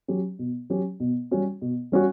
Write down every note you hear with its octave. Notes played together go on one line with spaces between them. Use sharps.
F#3 C#4 G4
B2
F#3 C#4 G4
B2
G3 C#4 F#4
B2
G3 C#4 F#4